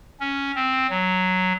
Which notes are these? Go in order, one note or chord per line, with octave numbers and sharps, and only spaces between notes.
C#4
C4
F#3